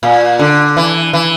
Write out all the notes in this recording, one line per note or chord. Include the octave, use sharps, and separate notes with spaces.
A#2
D3
E3
E3